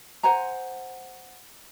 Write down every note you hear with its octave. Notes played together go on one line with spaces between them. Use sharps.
C5 F#5 G#5 A#5